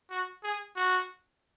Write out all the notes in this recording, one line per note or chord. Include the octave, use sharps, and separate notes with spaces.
F#4
G#4
F#4